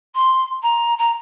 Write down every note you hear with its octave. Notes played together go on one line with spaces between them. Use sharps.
C6
A#5
A#5